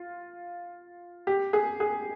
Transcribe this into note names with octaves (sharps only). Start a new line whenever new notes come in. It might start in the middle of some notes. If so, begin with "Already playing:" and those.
Already playing: F4
G4
G#4
G#4